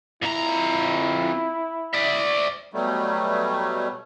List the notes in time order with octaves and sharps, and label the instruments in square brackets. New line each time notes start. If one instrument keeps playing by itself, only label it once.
[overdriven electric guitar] F2 A#5 [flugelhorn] E4
[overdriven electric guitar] D5 E5
[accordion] B2 F#3 G3 A3